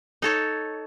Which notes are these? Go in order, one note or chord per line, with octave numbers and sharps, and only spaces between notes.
D#4 A4 C#5